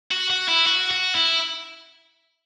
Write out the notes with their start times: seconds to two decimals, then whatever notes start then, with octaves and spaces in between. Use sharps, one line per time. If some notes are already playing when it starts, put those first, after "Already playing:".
0.11 F#4
0.30 F#4
0.48 E4
0.66 F#4
0.91 F#4
1.15 E4